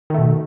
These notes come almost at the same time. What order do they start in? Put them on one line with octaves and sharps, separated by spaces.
D#3 A3 B2